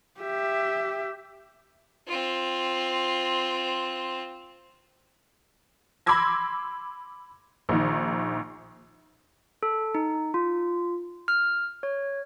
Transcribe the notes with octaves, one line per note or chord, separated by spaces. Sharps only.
G4 E5
C4 F4
B5 C6 D6 E6 G#6 A#6
A#1 D#3
A4
D#4
F4
F6
C#5